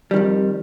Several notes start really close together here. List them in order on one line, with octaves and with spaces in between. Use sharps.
G3 D#3 F2